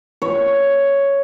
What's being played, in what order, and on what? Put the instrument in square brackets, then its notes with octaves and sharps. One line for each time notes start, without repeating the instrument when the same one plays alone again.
[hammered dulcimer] C#5